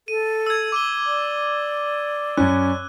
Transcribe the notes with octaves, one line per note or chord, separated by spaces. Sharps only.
A4 D#7
E6 G#6
D6 D#7 G7
D5
F#2 C#4 F#6